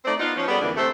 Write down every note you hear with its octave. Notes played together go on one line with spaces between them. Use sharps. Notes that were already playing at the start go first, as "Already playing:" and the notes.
A3 C4 D#4 D5
B3 D#4 F4
F3 C#4
G3 B3 G#4 A4 D5
F2 D3 E3 A#3 D4
C3 A3 A4 C5